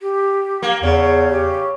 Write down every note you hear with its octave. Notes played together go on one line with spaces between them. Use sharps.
G4
A#3
E2 C#3
G4